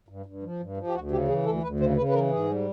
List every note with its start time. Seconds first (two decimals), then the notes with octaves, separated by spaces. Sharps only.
0.09 G2
0.26 G2
0.43 F3
0.60 G2
0.77 F3
0.87 G4
0.94 D2 F#4
1.11 C#3 G4
1.28 E3 G#4
1.45 D2 A4
1.63 D2 B4
1.80 C#3 C5
1.97 C#3 B4
2.09 B4
2.14 E3 A#4
2.31 G#2 G#4
2.48 G3